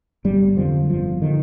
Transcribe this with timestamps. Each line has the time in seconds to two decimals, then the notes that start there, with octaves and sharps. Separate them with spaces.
0.25 G1 G3
0.57 F2 D3 F3
0.90 G1 F3
1.22 D3 D#3